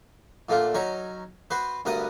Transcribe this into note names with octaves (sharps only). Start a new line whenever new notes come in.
A#2 D3 A3 F4
F#3 C#4 D#4 C#5
B3 F#4 B4 C5
D2 G2 B3 A#4 F#5 D#6